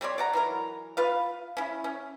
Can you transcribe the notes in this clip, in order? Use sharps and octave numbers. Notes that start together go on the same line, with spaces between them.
G3 C4 C#5 D5
D5 F#5 A#5
E3 F#3 A#4
F4 B4 F5
C#4 E4
C#4